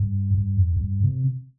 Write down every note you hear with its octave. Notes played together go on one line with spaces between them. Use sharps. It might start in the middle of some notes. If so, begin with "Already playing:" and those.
Already playing: G2
G2
F2
F2
G2
C3